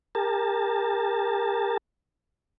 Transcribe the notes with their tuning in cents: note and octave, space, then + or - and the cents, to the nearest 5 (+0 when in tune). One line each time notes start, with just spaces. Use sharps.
G4 +40 A#4 +0 A5 +0